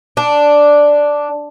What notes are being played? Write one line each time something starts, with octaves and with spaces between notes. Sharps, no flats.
D4